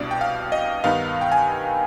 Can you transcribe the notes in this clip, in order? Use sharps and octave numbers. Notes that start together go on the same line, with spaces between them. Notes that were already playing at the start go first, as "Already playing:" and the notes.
Already playing: C2 B2 B3 D4 D5
G5
F5
D#5
G2 D#3 B3 D#4 F5
G5
G#5